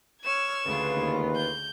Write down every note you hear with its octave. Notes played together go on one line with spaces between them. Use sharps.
C#5 E6 F6 G#6 E7
D2 C#3 F4 B4
D#2
G6